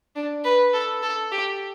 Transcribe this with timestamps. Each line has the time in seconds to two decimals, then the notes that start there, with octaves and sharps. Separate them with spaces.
0.16 D4
0.44 B4
0.74 A4
1.03 A4
1.32 G4